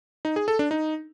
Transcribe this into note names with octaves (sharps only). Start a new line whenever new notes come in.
D#4
G#4
A4
D4
D#4